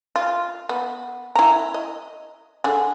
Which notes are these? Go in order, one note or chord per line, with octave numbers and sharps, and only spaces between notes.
F4
B3
E4 A#5
D#5
D3 G#4